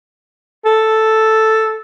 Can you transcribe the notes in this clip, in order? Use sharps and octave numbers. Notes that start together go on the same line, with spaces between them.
A4